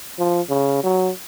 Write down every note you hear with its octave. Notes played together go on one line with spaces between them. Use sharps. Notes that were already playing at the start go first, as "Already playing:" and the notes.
F3
C#3
F#3